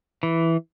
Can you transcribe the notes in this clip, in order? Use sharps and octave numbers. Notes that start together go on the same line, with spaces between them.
E3